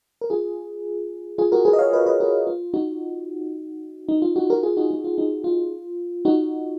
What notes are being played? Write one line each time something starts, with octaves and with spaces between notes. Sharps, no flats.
A#4
F4 G#4
F4 G#4
F#4 A#4
G#4 B4
D#5
C#5 F5
B4 D#5
B4 D#5
F#4 A#4
F4
D#4 F#4
D#4
F4
D#4 F#4
F#4 A#4
F4 G#4
D#4 F#4
D#4
F4
D#4
F4
D#4 F#4